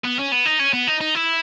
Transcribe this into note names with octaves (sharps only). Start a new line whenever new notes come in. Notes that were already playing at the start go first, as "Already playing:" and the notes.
B3
C#4
B3
D#4
C#4
B3
D#4
D#4
E4